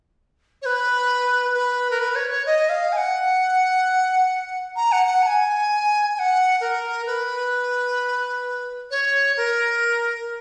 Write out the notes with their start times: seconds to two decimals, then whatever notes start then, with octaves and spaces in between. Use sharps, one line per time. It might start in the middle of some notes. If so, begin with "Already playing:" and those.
0.62 C#5
0.65 B4
1.54 B4
1.90 A#4
1.99 B4
2.15 C#5
2.30 C#5
2.46 D#5
2.69 F5
2.92 G#5
2.97 F#5
4.76 A#5
4.92 F#5
5.06 F#5
5.22 A#5
5.26 G#5
6.14 G#5
6.19 F#5
6.60 A#4
7.06 B4
8.91 C#5
9.37 A#4